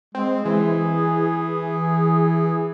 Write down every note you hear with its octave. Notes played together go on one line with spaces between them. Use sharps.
G#3 C4
E3 G#4